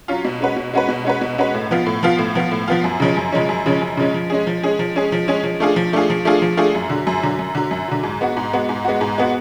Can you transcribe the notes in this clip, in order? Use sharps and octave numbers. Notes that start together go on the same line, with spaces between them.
F#3 C#4 F4
B2
G#3 C#4 F#4 B4
B2
G#3 C#4 F#4 B4
B2
G#3 C#4 F#4 B4
B2
G#3 C#4 F#4 B4
A2
F3 B3 F4
A2
F3 B3 F4
A2
F3 B3 F4
A2
F3 B3 F4
F#2
C#3 F3 G#3 C#4
F#2
C#3 F3 G#3 C#4
F#2
C#3 F3 G#3 C#4
F#2
C#3 F3 G#3 C#4
F3
G#3 C#4 G#4
F3
G#3 C#4 G#4
F3
G#3 C#4 G#4
F3
G#3 C#4 G#4
F3
A3 D4 F4 G#4
F3
A3 D4 F4 G#4
F3
A3 D4 F4 G#4
F3
A3 D4 F4 G#4
F#2
D3 F#3
F#2
D3 F#3
F#2
D3 F#3
F#2
D3 F#3
G#2
G#3 B3 F#4
G#2
G#3 B3 F#4
G#2
G#3 B3 F#4
G#2
G#3 B3 F#4